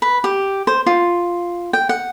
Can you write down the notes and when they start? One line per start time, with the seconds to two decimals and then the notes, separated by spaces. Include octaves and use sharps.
0.02 B4
0.24 G4
0.67 C5
0.86 F4
1.73 G5
1.89 F#5